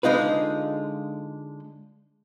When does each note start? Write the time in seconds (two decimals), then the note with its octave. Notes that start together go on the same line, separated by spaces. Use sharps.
0.03 D3 G#3 D#4 F4 B4